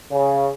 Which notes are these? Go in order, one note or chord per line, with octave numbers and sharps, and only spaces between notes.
C#3